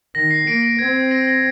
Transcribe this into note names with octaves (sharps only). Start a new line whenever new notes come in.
D#3 A#6
C7
A#3 A#6 D7
A#6 D7
C4 G#6
A#6 D7
A#6